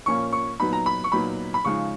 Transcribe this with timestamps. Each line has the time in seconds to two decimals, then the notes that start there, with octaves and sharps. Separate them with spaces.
0.06 A#2 F3 A#3 C#4 C#6
0.33 C#6
0.60 A#2 F#3 B3 D#4 B5
0.73 A#5
0.86 B5
1.04 C#6
1.12 A#2 F#3 B3 D#4 B5
1.54 B5
1.65 C#3 F3 G#3 D#4 C#6